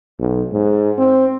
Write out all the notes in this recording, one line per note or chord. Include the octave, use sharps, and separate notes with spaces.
B1
G#2
C4